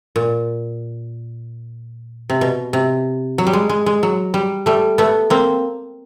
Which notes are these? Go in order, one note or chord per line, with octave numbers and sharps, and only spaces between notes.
A#2
C3
B2
C3
F#3
G3
G#3
G#3
G#3
F#3
G3
G3 A3
A3 B3
A#3 C4